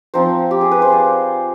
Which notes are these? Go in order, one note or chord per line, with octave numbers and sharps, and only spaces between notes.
F3 C4 D#4 C5
G4
G#4
B4
C5
D5